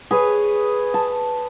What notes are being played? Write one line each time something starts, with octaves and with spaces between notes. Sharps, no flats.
G#4 B4 C#5
A5